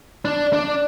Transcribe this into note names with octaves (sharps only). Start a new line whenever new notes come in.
D4
D4